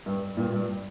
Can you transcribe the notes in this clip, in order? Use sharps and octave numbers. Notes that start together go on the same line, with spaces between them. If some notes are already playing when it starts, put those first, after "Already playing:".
G2
G2 A#2
G2